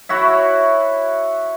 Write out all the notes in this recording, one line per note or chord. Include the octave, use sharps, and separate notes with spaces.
E4 F#4 C#5 E5